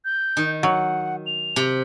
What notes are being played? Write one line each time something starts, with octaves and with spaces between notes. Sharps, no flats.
G6
D#3
F#3 F#5
F7
C3